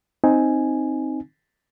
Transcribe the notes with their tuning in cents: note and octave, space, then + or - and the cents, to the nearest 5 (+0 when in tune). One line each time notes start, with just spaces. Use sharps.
C4 +10 D#4 +0 G#5 +0